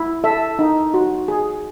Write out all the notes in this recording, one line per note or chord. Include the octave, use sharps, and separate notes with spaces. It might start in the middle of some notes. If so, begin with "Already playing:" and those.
Already playing: E4
A4 E5
D#4
F#4
G#4